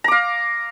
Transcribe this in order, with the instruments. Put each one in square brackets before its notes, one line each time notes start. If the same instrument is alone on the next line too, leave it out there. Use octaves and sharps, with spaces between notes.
[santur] A#5
D6
F5